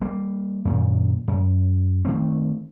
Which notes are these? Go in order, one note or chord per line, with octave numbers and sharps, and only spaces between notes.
G3 A#3
F#2 A#2 D#3
F#2
D#3 A3 C4